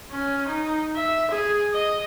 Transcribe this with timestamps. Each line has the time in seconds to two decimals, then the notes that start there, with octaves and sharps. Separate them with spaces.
0.12 C#4
0.48 D#4
0.96 E5
1.31 G#4
1.73 D#5